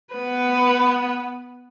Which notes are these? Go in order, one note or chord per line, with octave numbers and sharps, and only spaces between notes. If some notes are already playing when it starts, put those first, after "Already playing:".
B3 B4